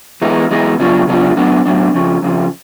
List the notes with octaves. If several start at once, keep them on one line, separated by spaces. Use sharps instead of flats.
E3 G#3 B3 D#4
E3 G#3 B3 D#4
C#3 F#3 B3 D4 F4
C#3 F#3 B3 D4 F4
A2 F#3 B3 D4
A2 F#3 B3 D4
F2 C#3 F3
F2 C#3 F3